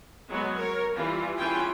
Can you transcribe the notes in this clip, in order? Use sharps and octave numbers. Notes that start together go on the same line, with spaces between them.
F#3 G#3 B3
A#4 C#5
E3 G3 F4
E3 C#4 F4 G#4 G5